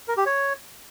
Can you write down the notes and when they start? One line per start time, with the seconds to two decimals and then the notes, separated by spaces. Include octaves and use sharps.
0.08 A#4
0.17 G4
0.26 C#5